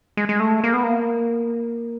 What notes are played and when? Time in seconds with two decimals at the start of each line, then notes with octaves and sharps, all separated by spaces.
0.17 G#3
0.29 G#3
0.40 A3
0.64 A#3
0.74 B3
0.83 A#3